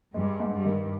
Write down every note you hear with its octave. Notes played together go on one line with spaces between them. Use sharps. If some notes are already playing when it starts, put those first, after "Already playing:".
G2 G#3
G#2
G2
D#3